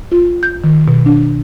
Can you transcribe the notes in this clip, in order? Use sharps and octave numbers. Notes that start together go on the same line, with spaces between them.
F4
G6
D#3
B2
D4